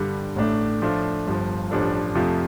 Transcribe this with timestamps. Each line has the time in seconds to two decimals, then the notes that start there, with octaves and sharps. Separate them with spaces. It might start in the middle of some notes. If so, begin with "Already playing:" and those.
Already playing: G2 D3 G3
0.36 A1 A2 A3 D4
0.81 A2 F3 A3 D4 F4
1.26 G1 G2 F3
1.71 A1 G2 F3 D4 A4
2.15 F2 C3 F3 A3 F4